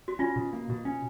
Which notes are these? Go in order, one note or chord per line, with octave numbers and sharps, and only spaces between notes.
F#4
C#4 F4
B2
A#3
B2
C#4